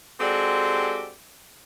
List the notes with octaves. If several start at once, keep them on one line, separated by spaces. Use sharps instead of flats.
G#3 C4 D4 F#4 G4 A4